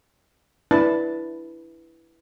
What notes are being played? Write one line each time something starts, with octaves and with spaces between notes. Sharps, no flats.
D4 E4 B4 A5